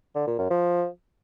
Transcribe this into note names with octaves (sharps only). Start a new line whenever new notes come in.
D3
A#2
F#2
F3